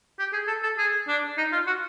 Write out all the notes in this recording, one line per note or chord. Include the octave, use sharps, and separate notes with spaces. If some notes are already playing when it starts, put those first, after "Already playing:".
G4
G#4
A4
A4
G#4
D4
D#4
F4
F#4